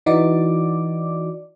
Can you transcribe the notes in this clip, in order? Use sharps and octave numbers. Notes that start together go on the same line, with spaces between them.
E3 D#4 F#4 D5 D6